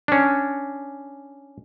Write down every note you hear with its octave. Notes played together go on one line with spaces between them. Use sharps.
C#4 D4